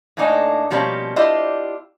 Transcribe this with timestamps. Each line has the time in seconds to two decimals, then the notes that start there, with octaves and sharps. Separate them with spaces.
0.17 A2 A3 A#3 D4 D#4 G#5
0.71 B2 F3 G3 A#3 C#4 A#5
1.16 D4 E4 F4 G4 C5 D#5